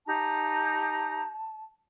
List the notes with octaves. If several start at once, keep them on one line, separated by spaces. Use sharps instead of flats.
D#4 G4 A5 A#5